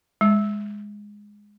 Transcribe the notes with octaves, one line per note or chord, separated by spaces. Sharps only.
G#3